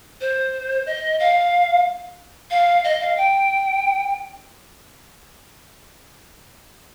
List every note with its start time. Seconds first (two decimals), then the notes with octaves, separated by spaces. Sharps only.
0.20 C5
0.86 D#5
1.19 F5
2.50 F5
2.84 D#5
3.00 F5
3.17 G5